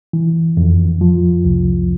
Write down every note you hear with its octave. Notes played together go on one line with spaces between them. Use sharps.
E3
F2
F3
C2